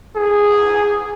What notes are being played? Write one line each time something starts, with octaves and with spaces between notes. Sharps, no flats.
G#4